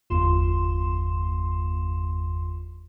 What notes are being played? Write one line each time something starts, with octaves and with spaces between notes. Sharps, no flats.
G1 E2 F4 C6 E7